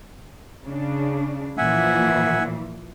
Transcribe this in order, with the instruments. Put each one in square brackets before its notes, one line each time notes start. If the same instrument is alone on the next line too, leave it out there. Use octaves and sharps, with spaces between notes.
[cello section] C#3 D4
[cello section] A#2 E3 F3 [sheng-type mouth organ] E5 F#5 G#5